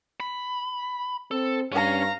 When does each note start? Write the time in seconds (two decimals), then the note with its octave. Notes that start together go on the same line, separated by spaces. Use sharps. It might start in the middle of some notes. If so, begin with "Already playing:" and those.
0.20 B5
1.31 C4 A4
1.73 G2 C#4 F5 A#5